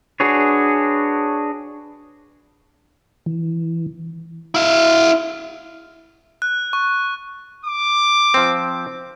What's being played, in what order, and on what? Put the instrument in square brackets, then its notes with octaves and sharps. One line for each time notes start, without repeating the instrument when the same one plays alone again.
[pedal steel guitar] D4 F#4 G#4 B4 C#5
[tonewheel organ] E3
[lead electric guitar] E4 F5
[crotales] F#6
C#6
[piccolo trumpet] D6
[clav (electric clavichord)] F3 C4